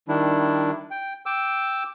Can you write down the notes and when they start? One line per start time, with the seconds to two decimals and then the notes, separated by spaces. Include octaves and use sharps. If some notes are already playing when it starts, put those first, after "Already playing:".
0.08 D#3 G3 D4 E4
0.91 G5
1.26 G5 D6 E6